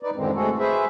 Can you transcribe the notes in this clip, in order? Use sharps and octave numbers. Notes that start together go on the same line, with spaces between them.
D#4 B4 D5
F#2 A2 D3 D#3 G#3 C4
G#3 A3 C4 F#4 G#4 A4
G#4 B4 C5 E5